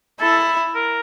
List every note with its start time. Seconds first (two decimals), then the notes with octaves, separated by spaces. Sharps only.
0.20 E4 A4
0.75 A#4